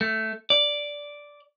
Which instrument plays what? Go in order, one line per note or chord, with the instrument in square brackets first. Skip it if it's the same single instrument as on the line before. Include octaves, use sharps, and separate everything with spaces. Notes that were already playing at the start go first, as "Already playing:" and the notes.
[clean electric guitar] A3
D5